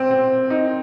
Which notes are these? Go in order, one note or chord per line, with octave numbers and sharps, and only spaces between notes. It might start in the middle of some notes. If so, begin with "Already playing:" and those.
Already playing: A#2 C4
C4
D#4